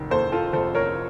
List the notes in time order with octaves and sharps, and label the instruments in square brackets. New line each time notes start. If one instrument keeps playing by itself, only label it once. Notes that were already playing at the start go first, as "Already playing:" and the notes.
Already playing: [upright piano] F1 D#3
D#2 A4 C5
F4 A4
F1 A4 C5
A#4 C#5